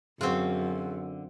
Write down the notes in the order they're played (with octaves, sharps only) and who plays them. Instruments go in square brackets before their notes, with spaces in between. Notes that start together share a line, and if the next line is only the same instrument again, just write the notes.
[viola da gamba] F#2 [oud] D3 F#4 [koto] C4 F4 [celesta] G#4